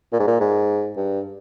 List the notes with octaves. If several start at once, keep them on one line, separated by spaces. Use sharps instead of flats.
A#2
G#2
A#2
G#2
G2